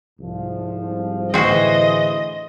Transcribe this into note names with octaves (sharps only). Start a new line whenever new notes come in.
C2 G#2 F3
A2 D3 E3 C4 F#4 G#4 C5 D#5